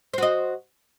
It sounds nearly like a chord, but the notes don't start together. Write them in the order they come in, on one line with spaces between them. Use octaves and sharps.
C5 F#4 D#5